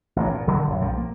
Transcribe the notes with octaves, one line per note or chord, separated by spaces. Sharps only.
A1 G2
A#2
D#1 D3 F#3 G3
A#1 F#2
B1 A#2 F3 G3
A#3